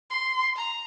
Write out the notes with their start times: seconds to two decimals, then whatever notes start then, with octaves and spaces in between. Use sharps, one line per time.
0.10 C6
0.56 A#5